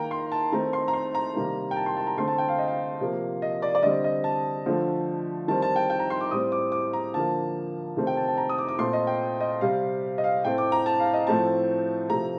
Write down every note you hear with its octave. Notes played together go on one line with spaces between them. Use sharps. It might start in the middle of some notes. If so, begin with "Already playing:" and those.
Already playing: D#3 A#3 G5 A#5
C6
A5
D#3 A3 C4 A#5
C6
A#5
C6
A#5
C3 D#3 G3 A#3
G5
A5
C6
A5
A#5
D3 A3 C4 C6
A5
G5
F5
D#5
F5
C3 F3 A#3
D#5
D5
D5
D3 G3 C4 D#5
D#5
A5
D3 F3 A3
D#3 G3 C4 A5
A5
G5
G5
A#5
C6
D6
A2 G3 C4 D#6
D6
D6
A#5
D3 F3 A#3 A5
C3 D#3 A3 C4
G5
A5
A5
A#5
D#6
D6
D6
A#2 A3 C4 C6
D#5
G5
D#5
C3 G3 C4 F5
D#5
F5
A2 A3 C4 G5
D6
A#5
A5
F5
D#5
A2 F3 A3 C4 A5
C3 F3 A3 A#5